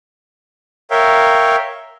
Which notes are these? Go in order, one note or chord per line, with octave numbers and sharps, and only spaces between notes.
A#4 C#5 E5 F5 G5